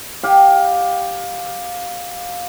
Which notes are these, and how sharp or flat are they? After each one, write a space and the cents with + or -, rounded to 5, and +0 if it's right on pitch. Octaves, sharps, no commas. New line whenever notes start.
G4 +0 F5 +20